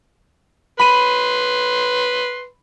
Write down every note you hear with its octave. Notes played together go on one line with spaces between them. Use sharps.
B4 B5 C6 D#7